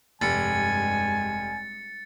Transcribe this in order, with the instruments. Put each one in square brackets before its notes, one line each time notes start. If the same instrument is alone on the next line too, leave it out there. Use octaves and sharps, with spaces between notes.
[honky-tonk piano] F1 [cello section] G2 G#3 [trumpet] G#5 [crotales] A6 C#7